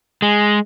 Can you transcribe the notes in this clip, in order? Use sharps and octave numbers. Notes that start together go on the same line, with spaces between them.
G#3